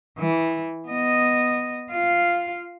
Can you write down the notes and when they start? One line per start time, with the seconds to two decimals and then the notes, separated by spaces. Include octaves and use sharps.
0.19 E3
0.88 B3 D#5
1.92 F4 F5